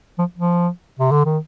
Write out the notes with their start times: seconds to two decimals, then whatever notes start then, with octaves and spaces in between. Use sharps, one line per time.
0.18 F3
0.38 F3
0.99 C3
1.11 D3
1.25 D#3